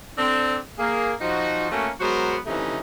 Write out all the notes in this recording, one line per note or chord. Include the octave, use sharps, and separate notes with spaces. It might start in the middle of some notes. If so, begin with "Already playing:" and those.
C4 D4 A4
A#3 G#4
F3 D#4 F#4
A3 A#3 C#4 F#4
F#3 G#3 B3 F#4 A#4 C5
C3 E3 F3 A3 C#4 D#4